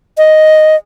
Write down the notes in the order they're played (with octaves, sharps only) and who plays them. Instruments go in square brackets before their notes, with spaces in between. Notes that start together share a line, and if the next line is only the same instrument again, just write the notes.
[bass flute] D#5